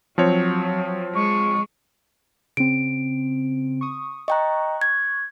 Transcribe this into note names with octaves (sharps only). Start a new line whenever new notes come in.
F3 F#3 C4 C#5
G#3 C#6
C#3 C4 D7
C#6 D#6
D#5 G5 A#5 C#6 F#6
G#6